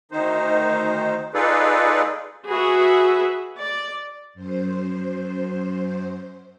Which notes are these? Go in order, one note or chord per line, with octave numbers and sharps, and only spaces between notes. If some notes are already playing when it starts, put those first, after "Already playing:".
D2 D#3 D#4 C5
D#4 F4 G#4 A4 B4 D5
F#4 G#4 B4 E5
D5
F#2 C5